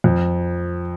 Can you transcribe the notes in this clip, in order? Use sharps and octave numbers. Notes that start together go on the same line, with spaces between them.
F2